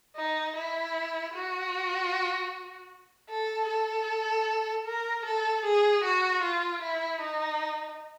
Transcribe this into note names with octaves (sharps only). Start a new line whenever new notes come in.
D#4
E4
F#4
A4
A4
A#4
A4
G#4
F#4
F4
E4
D#4